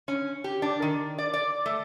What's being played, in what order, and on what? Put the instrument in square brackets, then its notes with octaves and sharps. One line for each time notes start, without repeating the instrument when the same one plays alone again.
[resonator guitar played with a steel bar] C#4
G4
D4
D#3
D5
D5
A3